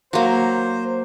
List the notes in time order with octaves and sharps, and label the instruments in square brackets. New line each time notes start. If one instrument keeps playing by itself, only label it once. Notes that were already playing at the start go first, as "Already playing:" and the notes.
[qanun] F#3 A#3 [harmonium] C5